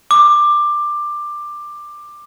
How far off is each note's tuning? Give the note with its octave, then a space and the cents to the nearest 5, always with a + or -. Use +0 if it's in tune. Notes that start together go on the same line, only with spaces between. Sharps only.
D6 +15